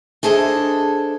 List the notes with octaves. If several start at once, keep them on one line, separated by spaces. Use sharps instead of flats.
D4 G#4 A4 C5 D#5